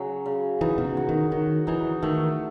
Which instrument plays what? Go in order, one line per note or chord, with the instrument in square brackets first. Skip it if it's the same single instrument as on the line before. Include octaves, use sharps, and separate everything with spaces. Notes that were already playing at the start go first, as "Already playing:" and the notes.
Already playing: [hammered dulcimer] C#3 F#3
C#3
[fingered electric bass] E3 [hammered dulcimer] D#4
[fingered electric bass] B2
C#3
[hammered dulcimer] F#4
[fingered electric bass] D#3
[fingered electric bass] D#3 [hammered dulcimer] F#4
[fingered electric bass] E3 [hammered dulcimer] D#4
[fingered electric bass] D#3 [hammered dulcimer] A3